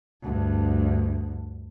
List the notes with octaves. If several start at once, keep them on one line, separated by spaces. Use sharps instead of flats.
D2 G2